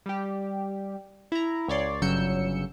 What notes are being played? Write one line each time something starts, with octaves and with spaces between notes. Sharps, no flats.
G3 G4
E4 A#5
C#2 C#5 D5 C6
G1 C#3 F#3 E6 G6 C#7